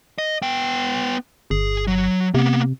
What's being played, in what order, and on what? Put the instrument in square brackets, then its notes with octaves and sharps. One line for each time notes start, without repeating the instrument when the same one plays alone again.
[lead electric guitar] D#5
B3 G5
[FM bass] G1 [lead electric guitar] G#4
[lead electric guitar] F#3
[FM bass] C3 [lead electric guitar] A#3 B3